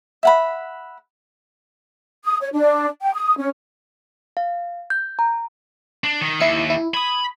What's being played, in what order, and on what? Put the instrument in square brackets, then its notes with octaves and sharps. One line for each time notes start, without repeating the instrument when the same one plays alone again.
[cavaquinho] E5 F#5 B5
[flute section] D#6
C#5
D4
G5
D#6
C#4
[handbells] F5
G6
A#5
[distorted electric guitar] D4
D#3
[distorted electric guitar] D#2 [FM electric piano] E4 E6 C#7
[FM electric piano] E4
[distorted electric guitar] B5 [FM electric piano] D#6 G#6